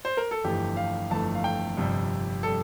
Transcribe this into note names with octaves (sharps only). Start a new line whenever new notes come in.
C5
A#4
A4
G1 F2 E3 A3 G4
F5
G1 F2 E3 A3 A5
F5
G5
G1 F2 C3 G3
C3 G3 A4